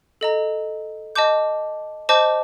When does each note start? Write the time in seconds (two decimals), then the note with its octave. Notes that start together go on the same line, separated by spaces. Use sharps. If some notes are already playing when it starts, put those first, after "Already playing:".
0.21 A4 D#5 A#5
1.16 D#5 A5 D6 G6
2.09 C5 D#5 A5 D6 G6